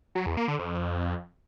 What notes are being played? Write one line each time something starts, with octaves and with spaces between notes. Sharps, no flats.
F#3
E2
A#3
D3
F2